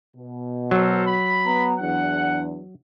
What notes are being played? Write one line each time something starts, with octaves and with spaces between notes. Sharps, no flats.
B2
F#3 A4 A#4 C5
B5
B3 A#5
E2 D4 F#5